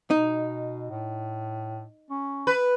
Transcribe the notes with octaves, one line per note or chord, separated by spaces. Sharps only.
B2 D#4
A2
C#4
B4